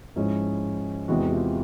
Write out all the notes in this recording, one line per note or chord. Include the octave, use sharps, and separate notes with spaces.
G#2 F3 G#3 C#4 E4
E2 C3 E3 G#3 B3 E4 F#4
F4 G4